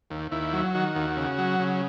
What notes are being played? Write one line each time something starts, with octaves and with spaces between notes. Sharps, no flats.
D#2
D#2 E4
F#3
D#3 F#4
D#2
C#3
F#3
C#3